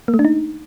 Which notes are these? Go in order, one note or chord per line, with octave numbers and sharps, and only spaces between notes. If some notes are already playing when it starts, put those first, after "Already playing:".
A#3
A3
D4
D#4